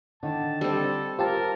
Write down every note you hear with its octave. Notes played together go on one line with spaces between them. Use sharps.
D3 D#3 A5
G3 C4 A4
F4 G4 A#4 C5 A5